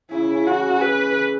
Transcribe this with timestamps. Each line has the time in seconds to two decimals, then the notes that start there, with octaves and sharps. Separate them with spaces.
0.11 C#3 E4
0.24 C#3
0.35 C#3
0.46 E3 F#4
0.59 A3
0.70 E3
0.82 B4